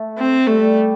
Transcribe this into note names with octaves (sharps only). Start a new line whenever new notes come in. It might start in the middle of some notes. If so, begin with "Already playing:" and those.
Already playing: A3
C4
G3 A3